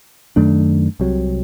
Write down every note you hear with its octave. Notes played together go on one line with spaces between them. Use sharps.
F#2 D#3 A3 D4
C2 C3 F#3